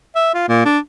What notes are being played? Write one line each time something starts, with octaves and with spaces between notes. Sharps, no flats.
E5
F4
A#2
D4